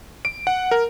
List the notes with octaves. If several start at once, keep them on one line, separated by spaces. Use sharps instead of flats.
D7
F#5
A#4